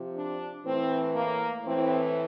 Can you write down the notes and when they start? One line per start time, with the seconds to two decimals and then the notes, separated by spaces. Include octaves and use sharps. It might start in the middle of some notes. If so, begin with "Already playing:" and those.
Already playing: C3 F3
0.16 D4
0.65 A2 E3 C4
1.16 A#3
1.65 A2 E3 C4